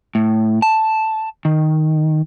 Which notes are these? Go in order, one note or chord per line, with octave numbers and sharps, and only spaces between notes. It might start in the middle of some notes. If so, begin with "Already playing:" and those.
A2
A5
D#3